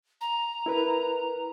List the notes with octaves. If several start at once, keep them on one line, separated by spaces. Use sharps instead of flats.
A#5
E4 A#4 B4